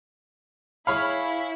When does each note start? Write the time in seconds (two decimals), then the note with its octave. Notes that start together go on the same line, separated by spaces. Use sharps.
0.87 E4 G#4 C#5 F5 B5